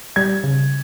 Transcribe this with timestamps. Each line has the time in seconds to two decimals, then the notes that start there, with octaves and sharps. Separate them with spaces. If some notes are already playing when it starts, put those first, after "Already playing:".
0.16 G3 G#6
0.44 C#3